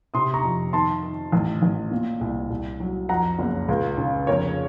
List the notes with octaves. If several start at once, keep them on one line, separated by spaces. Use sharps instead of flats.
C3 C6 D#6
A#5 C#6
F2
D#3 A5 C6
D#3
A1
A1
A#2
C2
C2
F#3
F2 F#5 A#5
F#1
C#2
C#3
F1 A#4 C#5